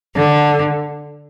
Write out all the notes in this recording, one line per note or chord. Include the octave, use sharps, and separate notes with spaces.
D3